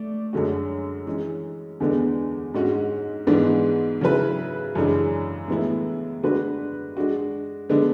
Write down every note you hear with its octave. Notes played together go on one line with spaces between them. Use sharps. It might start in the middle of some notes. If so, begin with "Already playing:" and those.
Already playing: A3 D5
F#2 D3 G#3 C#4 F#4
E3 G#3 C#4
E2 D3 G#3 B3 D4
G#2 G#3 C#4 F#4
G#2 E3 G#3 B3 D4
C#3 F#3 C#4 E4 B4
F#2 C#3 E3 G#3 D4
A2 E3 G#3 B3 E4
D3 G#3 D4 F#4 B4
G#3 D4 F#4
D3 G#3 B3 D4